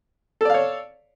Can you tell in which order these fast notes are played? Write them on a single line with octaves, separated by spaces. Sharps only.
A4 D5 F5 C#5